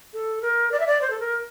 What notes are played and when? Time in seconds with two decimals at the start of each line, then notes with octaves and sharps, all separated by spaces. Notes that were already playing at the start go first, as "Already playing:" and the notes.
0.14 A4
0.42 A#4
0.72 D5
0.80 E5
0.87 D5
1.02 C5
1.10 A4
1.20 A#4